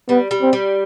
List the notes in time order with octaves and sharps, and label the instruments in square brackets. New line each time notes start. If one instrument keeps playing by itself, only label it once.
[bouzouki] G3 [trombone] B3
[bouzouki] G3
[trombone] C4
[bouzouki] G3